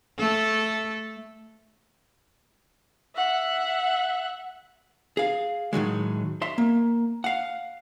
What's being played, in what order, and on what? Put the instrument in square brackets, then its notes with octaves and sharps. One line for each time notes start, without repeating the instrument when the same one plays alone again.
[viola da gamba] A3 A4
[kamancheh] E5 F#5
[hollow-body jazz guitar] G#4 F5
A2 D#3 F#3 G#3
E5 C6
A#3
F5 F#5